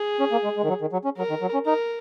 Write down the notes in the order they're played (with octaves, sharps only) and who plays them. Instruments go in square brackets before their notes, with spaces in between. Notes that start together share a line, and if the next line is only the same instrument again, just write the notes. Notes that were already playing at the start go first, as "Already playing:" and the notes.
Already playing: [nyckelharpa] G#4
[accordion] C#4
A#3
G#3
G#3
D#3
F#3
D#3
F#3
C#4
[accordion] F#3 [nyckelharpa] A#4
[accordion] D#3
F#3
C#4
[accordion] D#4 [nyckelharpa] A#4